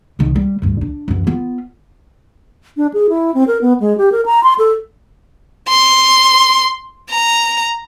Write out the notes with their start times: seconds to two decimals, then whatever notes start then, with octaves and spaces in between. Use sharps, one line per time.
0.19 C2 D#3
0.36 G3
0.62 D2 G2
0.81 D4
1.08 F#2 E3
1.27 B3 F4
2.77 D4
2.94 G#4
3.10 E4
3.34 C4
3.47 A#4
3.62 B3
3.80 G#3
3.98 G4
4.12 A#4
4.26 A#5
4.43 C6
4.58 A4
5.69 C6
7.10 A#5